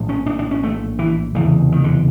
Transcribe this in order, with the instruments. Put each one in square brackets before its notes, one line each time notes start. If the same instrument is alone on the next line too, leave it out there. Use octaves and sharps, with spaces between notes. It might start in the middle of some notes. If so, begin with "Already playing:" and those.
Already playing: [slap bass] A#1 A2
C#4
D4
D4
C#4
A3
E3
F1 E2 C#3 E3
D#3
D3